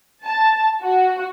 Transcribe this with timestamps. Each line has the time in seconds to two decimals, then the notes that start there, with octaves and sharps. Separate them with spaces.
0.24 A5
0.82 F#4